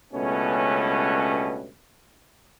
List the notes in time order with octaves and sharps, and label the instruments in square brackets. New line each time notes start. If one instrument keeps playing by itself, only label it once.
[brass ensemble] C#2 G2 B2 A3 B3 C#4